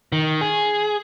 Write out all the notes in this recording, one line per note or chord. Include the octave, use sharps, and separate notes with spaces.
D#3
G#4